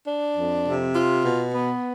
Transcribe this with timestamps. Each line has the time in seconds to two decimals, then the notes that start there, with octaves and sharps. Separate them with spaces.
0.07 D4
0.36 F2
0.66 C3
0.94 F4
1.24 B2
1.53 B3